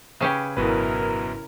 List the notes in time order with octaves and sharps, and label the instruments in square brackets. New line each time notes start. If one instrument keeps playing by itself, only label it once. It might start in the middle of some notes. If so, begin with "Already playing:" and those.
[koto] C#3 C#4 G4 [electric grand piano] G#4 B4 G#6
[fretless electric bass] G#1 [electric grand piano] F#2 B2 B4 [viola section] E4 A#4